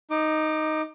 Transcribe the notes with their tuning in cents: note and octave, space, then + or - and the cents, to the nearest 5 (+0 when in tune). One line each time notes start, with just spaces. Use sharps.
D#4 +0 D6 +25